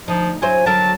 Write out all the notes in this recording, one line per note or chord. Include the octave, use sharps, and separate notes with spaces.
D2 F3 D#4
F#3 E4 C5 G#5
D3 F#3 A#4 A5